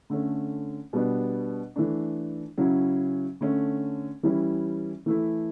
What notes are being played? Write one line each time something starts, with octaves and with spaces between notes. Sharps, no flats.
D3 A3 C#4
B2 G3 B3 D4
E3 A3 D4
C#3 F#3 C#4 E4
D3 A3 C#4
E3 G3 C#4 E4
E3 A3 E4